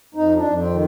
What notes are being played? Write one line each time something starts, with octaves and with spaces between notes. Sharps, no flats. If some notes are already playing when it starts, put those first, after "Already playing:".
F2 D#4
D4
F2
C4
D#3